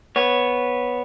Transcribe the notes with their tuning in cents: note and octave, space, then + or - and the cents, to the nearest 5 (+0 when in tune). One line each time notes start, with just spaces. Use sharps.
B3 -5 C#5 +0